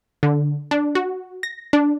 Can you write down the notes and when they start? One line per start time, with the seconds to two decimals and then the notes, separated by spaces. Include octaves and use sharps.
0.23 D3
0.71 D4
0.95 F#4
1.43 A#6
1.73 D4